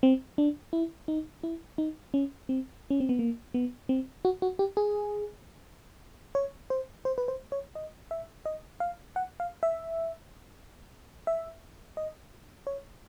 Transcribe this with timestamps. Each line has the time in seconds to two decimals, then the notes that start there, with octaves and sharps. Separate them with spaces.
0.03 C4
0.38 D4
0.73 E4
1.08 D#4
1.43 E4
1.78 D#4
2.14 C#4
2.49 C4
2.90 C#4
3.00 C4
3.09 B3
3.19 A#3
3.54 B3
3.89 C4
4.25 F#4
4.42 F#4
4.59 G4
4.77 G#4
6.35 C#5
6.70 C5
7.05 C5
7.18 B4
7.28 C5
7.52 C#5
7.75 D#5
8.11 E5
8.46 D#5
8.80 F5
9.16 F#5
9.40 F5
9.63 E5
11.27 E5
11.97 D#5
12.67 C#5